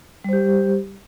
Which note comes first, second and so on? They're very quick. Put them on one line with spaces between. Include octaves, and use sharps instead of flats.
G3 C5 G4